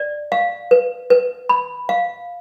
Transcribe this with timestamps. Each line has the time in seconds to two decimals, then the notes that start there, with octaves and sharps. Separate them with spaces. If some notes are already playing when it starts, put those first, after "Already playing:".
Already playing: D5
0.32 F5
0.71 B4
1.10 B4
1.49 B5
1.89 F5